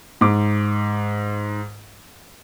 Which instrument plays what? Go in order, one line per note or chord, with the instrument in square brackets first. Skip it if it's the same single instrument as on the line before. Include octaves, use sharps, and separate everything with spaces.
[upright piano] G#2 D6